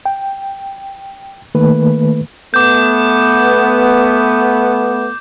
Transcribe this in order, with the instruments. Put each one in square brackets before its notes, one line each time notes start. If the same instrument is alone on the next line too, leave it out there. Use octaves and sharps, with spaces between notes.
[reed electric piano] G5
D#3 A3 A#3 B4
[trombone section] A3 B3 [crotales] D6 G6